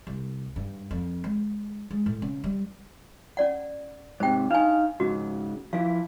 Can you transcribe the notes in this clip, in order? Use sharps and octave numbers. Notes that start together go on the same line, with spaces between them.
C2
G2
F2
G#3
G#3
A2
C#3
G3
C#4 D5 F#5
G#2 C3 C5 G5
D4 D#4 F5 G#5
G#2 C#3 F#4
F3 E4 F5